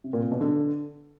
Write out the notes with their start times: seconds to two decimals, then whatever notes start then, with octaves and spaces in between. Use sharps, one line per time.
0.04 C3
0.13 A#2
0.22 C3
0.32 B2
0.41 D3